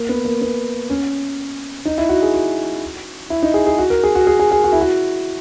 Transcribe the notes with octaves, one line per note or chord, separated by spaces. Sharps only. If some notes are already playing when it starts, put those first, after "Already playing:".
Already playing: A#3
B3
A#3
B3
C#4
D#4
E4
F#4
G#4
F#4
E4
D#4
G#4
G#4
F#4
A#4
G#4
F#4
G#4
G#4
G#4
F#4
E4
F#4